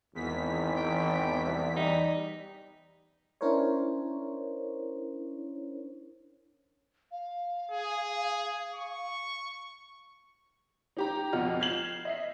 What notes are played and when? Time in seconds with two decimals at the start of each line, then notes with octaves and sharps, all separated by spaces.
0.15 G#1 E2 B6
0.77 G5
1.46 C2
1.76 G3 D#4
3.41 C#4 D4 E4 A#4 C5 C#5
7.11 F5
7.71 G#4
8.74 C#6
10.97 D#4 G4 A#5
11.33 F2 B2 F4 D#5 F#5 F6
11.60 F6 G6 G#6 C7 E7 F#7
12.05 D#5 E5 C7